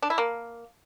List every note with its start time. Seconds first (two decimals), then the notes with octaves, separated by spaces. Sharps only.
0.02 D4
0.10 E4
0.18 A#3